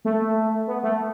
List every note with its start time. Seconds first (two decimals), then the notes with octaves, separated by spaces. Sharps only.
0.05 A3
0.67 B3
0.83 A3